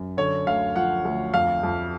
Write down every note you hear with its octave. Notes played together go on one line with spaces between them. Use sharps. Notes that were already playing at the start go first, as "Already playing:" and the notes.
Already playing: F#2
D3 C#5
D2 F5
F3 F#5
D2
F2 F5
F2